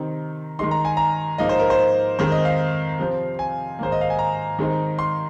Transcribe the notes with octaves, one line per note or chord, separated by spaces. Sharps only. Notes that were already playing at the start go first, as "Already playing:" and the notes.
Already playing: C3 D#3 C4 D#4
D#3 G#3 D#4 C6
A#5
G#5
A#5
G#2 F3 A#3 D#4 D#5
C5
A#4
C5
F2 D#3 G#3 C4 C5
D#5
F5
C3 F3 C4
G#5
G#2 D#3 A#3 C5
D#5
F5
G#5
A#5
D#3 G#3 C4 D#4
C6